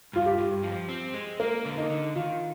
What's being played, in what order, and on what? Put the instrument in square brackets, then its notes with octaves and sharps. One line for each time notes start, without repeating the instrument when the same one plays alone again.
[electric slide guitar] G2 [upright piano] F4
[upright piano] G4
[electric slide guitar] G2
F3
C4
G#3
[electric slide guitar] A#3 [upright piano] A#4
[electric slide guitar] D3
[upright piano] D#4
[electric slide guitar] D3
[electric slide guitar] D#3 [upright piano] F4